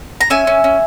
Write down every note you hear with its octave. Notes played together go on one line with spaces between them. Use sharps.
A#5
C#4 E5 G#5
C#4
C#4